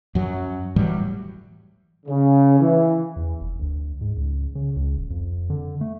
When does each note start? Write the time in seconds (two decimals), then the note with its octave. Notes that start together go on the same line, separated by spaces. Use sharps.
0.15 F#2 F#3
0.76 A2 E3 F#3 G3
2.06 C#3
2.60 E3
3.16 E2
3.41 F1
3.59 D2
4.01 G#2
4.17 C#2
4.55 C#3
4.77 C#2
4.97 D#1
5.11 F2
5.50 D3
5.81 A3